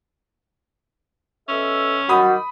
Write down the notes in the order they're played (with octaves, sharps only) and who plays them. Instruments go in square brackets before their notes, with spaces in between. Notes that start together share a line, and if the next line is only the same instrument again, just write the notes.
[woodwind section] B2 A4 E5 [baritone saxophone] C#4
[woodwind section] D#3 F#3 G3 [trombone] F#4 [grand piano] B5 D#6